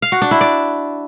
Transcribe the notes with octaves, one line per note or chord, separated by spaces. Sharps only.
F5
F#4
D4
E4
D5